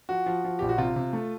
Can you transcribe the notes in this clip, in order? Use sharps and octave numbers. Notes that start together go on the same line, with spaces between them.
F3 F#4
F3
F3
A#1 G4
F#4
C3 F4
C3
A3